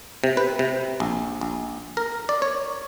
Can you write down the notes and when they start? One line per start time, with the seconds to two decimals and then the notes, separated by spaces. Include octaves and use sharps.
0.24 C3
0.37 B4
0.59 C3
1.00 A#1
1.41 A#1
1.97 A#4
2.29 D5
2.42 C#5